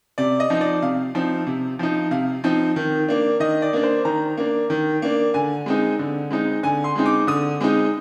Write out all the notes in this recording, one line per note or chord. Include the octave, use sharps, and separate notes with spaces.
C3 D5
D#5
F3 C4 D#4
D5
C3 F5
F3 C4 D#4
C3
F3 C4 D#4
C3 F5
F3 C4 D#4
D#3
A#3 D4
D#3 D#5
D5
A#3 D4
C5
D#3 A#5
A#3 D4
D#3
A#3 D4
D3 G#5
G#3 C4 D#4
D3
G#3 C4 D#4
D3 G#5
C6
G#3 C4 D#4
D6
D3 D#6
G#3 C4 D#4